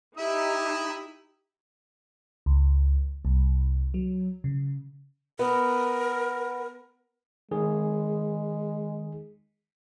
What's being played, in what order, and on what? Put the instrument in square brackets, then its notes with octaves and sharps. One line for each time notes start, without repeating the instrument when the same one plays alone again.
[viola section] D#4 G4 [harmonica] E4 E5 D#6
[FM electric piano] C#2
C2
F#3
C#3
[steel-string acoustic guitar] B3 [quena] A#4
[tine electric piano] D#3 G#4 [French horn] G#3